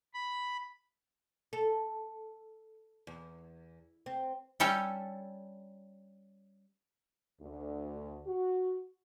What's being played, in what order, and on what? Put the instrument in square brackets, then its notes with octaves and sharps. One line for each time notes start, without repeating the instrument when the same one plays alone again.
[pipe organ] B5
[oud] A4
E2
C4
[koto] G3 C#4 G4 A4 C#5
[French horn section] D2
F#4